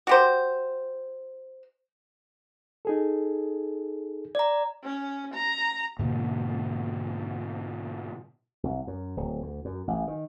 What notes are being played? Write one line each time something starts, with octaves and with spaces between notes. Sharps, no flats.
F#4 G4 C5
D#4 G#4 A4
D5 A#5
C#4
A#5
G#2 B2 D3 A#3
C2
F#2
D1
D2
F#2
A1
D#3